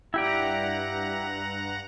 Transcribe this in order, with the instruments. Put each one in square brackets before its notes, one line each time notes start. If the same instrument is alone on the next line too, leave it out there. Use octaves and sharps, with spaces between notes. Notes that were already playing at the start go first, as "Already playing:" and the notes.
[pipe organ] G2 F#5 A#5 [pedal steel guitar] E4 G4 D5